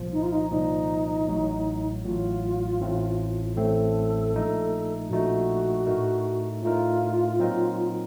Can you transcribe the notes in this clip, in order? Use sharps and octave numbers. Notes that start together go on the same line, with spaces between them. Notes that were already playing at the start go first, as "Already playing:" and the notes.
Already playing: C2 A#2 F3
D#4
F4
D#4
C2 A#2 F3 D#4
A1 A2 F#3
A1 A2 F#3 F4
A1 A2 A3 C4
A1 A2 A3 C4 A4
A#1 A#2 A3 D#4
A#1 A#2 A3 D#4 F#4
A2 A3 D#4 A#4
A2 A3 D#4 F4 A#4
A#2 F#3 C4 D#4 A#4